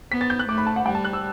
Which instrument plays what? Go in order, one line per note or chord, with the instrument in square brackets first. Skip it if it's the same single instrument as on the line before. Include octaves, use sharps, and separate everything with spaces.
[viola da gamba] B3 [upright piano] B6
[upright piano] A6
G6
F#6
[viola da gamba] A3 [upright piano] D6
[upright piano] B5
A5
F#5
[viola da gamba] G3 [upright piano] G5
[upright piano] A5
F#6
E6